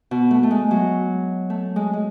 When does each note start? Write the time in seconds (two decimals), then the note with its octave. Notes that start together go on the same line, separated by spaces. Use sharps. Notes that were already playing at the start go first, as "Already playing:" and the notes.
0.11 B2
0.31 A3
0.43 A3
0.51 G#3
0.71 F#3
1.50 A3
1.76 G#3
1.93 G#3